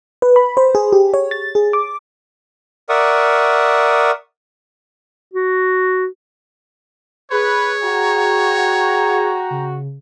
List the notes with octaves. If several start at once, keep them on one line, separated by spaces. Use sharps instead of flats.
B4
B5
C5
G#4
G4
C#5
A6
G#4
D6
A#4 D5 E5 F#5 C#6 D#6
F#4
G#4 B4 C#5
F#4 G5 A#5
C#3